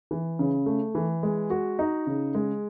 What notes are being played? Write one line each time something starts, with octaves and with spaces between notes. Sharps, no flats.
E3
C#3
A3
E3
G#3
F#4
D#4
C#3
G#3